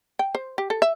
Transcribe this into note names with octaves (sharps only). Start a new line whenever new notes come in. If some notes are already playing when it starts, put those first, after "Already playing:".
G5
C5
G4
A4
E5